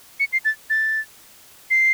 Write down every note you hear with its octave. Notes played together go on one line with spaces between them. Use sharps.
C#7
C7
A6
A6
C7